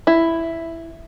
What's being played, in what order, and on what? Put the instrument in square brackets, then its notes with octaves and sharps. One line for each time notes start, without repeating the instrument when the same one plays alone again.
[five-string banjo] E4